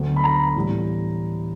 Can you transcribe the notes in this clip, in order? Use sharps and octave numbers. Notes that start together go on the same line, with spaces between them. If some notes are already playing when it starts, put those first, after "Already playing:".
Already playing: D2 D3 F#3 B3
B5
A#5
A2 E3 G3 B3